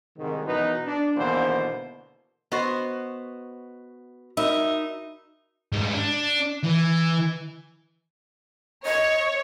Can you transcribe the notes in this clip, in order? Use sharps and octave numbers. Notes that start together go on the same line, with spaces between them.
C2 G#2 D#3
F#2 B2 E3 D#4 F#4 B4
D4
G#1 B2 D3 E3 A#3 C5
B3 F#4 C5 D#5 C#6
D#4 F#4 A#4 E5 B5
G#2 G3
D4
E3
C#5 D#5